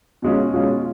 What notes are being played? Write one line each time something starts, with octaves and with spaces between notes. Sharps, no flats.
B2 G#3 C#4 F4
B2 G#3 C#4 F4